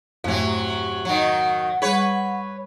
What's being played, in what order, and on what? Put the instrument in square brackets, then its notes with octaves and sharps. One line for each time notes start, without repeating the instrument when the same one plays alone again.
[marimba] F2 G#2 A3 [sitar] C3 F#3
[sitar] D#3 F#3 [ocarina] F#5
[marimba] G3 G#4 [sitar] B4 C#5